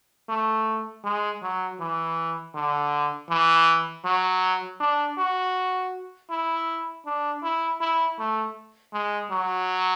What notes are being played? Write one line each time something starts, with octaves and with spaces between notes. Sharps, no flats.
A3
G#3
F#3
E3
D3
E3
F#3
D4
F#4
E4
D4
E4
E4
A3
G#3
F#3